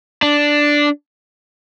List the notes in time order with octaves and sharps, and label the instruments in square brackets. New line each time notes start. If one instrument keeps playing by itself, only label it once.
[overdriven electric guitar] D4